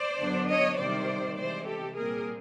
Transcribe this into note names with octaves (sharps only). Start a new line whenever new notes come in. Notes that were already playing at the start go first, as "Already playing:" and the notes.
Already playing: C5 D5
F#2 D3 F#3 B3 D4
C#5 D#5
C3 D#3 G3 C5 D5
C3 E3 G#3 C4 C5 D5
G4 A4
A#2 G3 C4 G#4 A#4